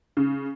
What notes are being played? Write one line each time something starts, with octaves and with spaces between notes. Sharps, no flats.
C#3